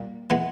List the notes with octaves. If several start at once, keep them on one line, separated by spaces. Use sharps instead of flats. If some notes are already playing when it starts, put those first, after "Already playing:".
Already playing: A#2 G3 A#3
E3 G#3 B3